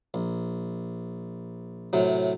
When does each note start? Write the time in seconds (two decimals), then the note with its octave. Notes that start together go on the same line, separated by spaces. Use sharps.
0.14 A#1
1.93 A2 C3 F#3